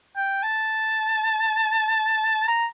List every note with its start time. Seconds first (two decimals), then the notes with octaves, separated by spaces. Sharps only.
0.16 G5
0.43 A5
2.48 A#5